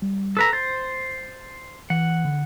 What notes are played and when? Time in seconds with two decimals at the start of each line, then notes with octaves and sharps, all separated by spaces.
0.02 G3
0.37 A4 B4 A#5 E6
0.53 C5 A6
1.90 E3 F#5
2.25 D3